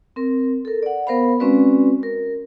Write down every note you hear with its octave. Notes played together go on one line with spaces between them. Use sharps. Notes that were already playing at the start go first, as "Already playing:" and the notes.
C4 A#4
A4 A#4
D5 F#5
B3 A#4 C5 F5 B5
G#3 C4 C#4 F#4 B4 D5
A#4